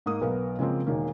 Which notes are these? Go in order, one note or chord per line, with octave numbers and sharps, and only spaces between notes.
G#2 A#3 D#6
B1 B3 A#4 F5
C#3 F3 G#3 A#3 C4
E1 D#3 A#3